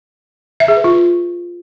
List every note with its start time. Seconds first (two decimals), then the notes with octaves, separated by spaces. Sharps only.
0.60 E5
0.68 G#4
0.76 B4
0.84 F4